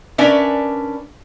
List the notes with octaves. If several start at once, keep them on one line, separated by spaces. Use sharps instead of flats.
C#4 D4 A#4 B4 D5 E5